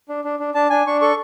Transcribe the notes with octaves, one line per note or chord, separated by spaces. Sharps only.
D4
D4
D4
D4 A5
D4 G#5
D4 C#6
A4 C#6